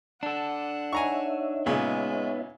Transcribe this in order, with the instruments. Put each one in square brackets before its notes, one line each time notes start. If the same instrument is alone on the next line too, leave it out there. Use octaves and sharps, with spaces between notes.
[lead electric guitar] D4 A4 [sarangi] F#5
[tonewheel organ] D#4 C#5 E5 [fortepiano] G#5 A#5 C#6
[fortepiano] A#2 C#3 [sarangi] G#3 [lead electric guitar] B3